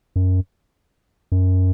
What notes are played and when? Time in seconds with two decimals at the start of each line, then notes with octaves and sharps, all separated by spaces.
0.16 F#2
1.32 F#2